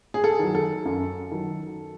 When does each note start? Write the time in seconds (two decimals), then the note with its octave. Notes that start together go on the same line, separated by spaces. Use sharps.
0.14 G#4
0.24 A4
0.39 D#3 F#3
0.55 A4
0.85 F#2
1.31 D#3 F#3